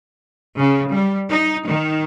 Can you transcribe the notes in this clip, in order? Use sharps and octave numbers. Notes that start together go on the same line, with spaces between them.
C#3
G3
D#4
D#3